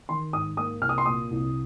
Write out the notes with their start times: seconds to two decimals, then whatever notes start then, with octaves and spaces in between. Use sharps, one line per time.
0.09 D#3 C6
0.33 G#2 D#6
0.57 A#3 D#6
0.82 C2 F6
0.89 D#6
0.98 C6
1.06 A#2 D#6
1.31 C2